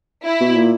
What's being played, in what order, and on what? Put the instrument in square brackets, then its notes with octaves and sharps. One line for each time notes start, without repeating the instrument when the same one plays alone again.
[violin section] E4
[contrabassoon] B2
A#2